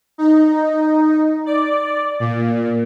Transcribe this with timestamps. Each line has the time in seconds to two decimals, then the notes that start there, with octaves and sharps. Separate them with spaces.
0.18 D#4
1.46 D5
2.20 A#2